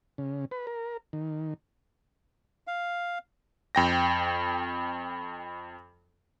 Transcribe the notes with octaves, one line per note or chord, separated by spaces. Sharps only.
C#3
B4
A#4
D#3
F5
F2 G5 A#6